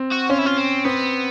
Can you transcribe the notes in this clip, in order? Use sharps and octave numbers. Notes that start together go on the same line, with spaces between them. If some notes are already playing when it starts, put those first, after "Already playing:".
Already playing: C4
F#4
C#4 F4
E4
F4
C4
B3 C4